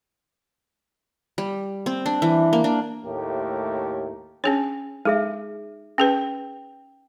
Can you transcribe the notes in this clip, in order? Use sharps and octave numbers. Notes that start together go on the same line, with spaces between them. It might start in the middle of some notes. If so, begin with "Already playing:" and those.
G3
C4
D4
E3
A#3
D4
D#2 A2 A3 G4 A#4
C#4 D4 G#4 C#5
G#3 D#4 G#4 E5
C#4 G#4 B4 G5